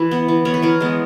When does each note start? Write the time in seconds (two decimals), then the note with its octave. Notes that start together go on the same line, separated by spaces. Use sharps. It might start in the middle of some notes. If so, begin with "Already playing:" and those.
Already playing: E3 B4
0.11 B3
0.28 E3
0.45 B3 C#5
0.54 B4
0.62 E3 A#4
0.80 G#3 B3